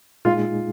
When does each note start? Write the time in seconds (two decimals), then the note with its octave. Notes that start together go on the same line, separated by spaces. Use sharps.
0.25 A#2 G#3 D#4 F4 G#4